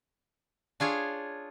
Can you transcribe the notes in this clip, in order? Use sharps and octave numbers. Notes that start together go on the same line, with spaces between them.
D4 F4 G#4 C#5